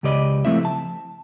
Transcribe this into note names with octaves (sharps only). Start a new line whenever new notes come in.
C#2 C#3 G4 B4 D5 D#5
F3 A3 C4 E4 E5
A5